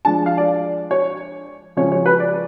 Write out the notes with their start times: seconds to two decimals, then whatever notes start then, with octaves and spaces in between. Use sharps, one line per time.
0.05 F3 G#3 D4 A5
0.26 F5
0.38 D5
0.91 C#5
1.77 C#3 F3 G#3 C#4 C#5
1.92 C#5
2.06 B4
2.20 D5